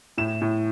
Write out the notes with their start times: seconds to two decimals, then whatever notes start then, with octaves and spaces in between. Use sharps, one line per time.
0.18 A2 E7
0.42 A2